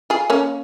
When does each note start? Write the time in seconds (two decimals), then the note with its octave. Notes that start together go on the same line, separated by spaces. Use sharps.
0.10 F4 G#4
0.30 A#3 C#4